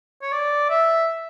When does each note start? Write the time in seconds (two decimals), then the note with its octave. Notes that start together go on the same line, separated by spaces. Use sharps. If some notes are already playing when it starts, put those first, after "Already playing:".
0.22 C#5
0.32 D5
0.70 E5